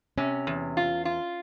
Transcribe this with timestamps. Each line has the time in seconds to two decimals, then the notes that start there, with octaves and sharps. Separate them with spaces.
0.18 C3 C#4
0.47 E2
0.77 F4
1.05 F4